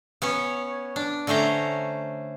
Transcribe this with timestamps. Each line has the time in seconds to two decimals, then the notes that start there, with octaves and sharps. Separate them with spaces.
0.22 B3 C#4 C#5
0.96 D4
1.27 D3 A3 C#4 C5 A#5